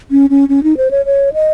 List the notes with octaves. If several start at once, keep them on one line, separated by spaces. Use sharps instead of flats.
C#4
C#4
C#4
D#4
C5
C#5
C#5
D#5